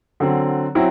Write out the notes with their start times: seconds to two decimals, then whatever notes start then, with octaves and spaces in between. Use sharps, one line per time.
0.20 D3 F#3 C4
0.75 F#3 C4 E4